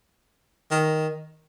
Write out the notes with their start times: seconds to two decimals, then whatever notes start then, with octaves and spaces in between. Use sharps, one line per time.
0.71 D#3